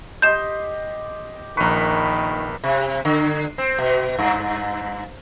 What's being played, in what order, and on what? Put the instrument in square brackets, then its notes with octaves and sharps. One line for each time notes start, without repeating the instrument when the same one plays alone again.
[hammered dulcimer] G4 D#5 C6 [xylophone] G6 E7
[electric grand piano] A#1 C#6 [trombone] D#3 [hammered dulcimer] A#4 B4
[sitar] C3
D3
C4
B2
G2